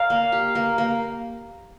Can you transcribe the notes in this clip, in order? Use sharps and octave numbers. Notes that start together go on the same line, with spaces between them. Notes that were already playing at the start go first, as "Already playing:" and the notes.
Already playing: A#4 D5 F5
A#3
G4
A#3
A#3